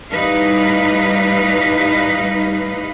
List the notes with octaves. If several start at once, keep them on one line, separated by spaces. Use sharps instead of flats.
A2 G3 D#4 B4 F5